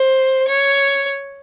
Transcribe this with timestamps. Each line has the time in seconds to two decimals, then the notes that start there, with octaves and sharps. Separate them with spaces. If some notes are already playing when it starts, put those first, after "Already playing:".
Already playing: C5
0.47 C#5